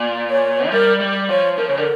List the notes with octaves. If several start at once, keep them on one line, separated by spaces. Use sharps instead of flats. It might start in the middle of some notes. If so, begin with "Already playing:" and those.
Already playing: A#2
C#5
F3
G3 A#4
G3
F3 C#5
F3 A#4
C#3 C#5
D3 A#4